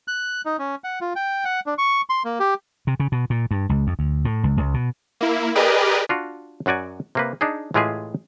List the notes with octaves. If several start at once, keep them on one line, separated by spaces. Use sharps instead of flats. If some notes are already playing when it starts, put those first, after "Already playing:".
F#6
D#4
C#4
F#5
F4
G5
F#5
D4
C#6
C6
A#3
G4
C3
C#3
B2
A#2
G2
C#2
F2
D2
A2
C#2
C#2
B2
A#3 E4
G4 G#4 A#4 B4 D5 D#5
D4 F4 F#4
F#2 F#3 F#4 D5 G#5
C3 A#3 B4
D4 D#4 G#4
A2 E3 G#3 F4 G4 G#4